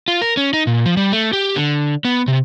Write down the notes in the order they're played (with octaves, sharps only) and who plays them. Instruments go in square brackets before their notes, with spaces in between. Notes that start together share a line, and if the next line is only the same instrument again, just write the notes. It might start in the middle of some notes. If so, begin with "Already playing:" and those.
[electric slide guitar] F4
A#4
C#4
D#4
A#2
F3
G3
A3
G4
D3
B3
C3